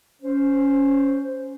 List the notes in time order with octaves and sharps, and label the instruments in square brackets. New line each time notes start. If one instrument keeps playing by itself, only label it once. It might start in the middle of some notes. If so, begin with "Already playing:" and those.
[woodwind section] C#4 C5